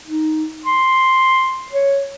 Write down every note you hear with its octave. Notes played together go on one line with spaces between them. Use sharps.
D#4
C6
C#5